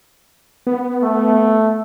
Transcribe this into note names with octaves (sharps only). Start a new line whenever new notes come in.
B3
A3